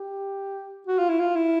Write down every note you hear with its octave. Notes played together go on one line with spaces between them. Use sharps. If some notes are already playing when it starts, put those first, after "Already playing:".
Already playing: G4
F#4
F4
E4
F4
E4